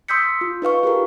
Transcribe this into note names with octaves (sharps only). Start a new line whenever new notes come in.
C6 D#6 E6 G6 B6 C#7
F4
D#4 B4 F5 C#6
F4 G4 G#4 A#4